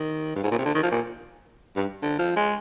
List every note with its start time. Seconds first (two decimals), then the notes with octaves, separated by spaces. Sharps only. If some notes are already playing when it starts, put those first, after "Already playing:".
Already playing: D#3
0.36 G2
0.43 G#2
0.51 A#2
0.58 C3
0.65 D3
0.74 D#3
0.83 F3
0.91 A#2
1.76 G2
2.02 D3
2.19 F3
2.36 G#3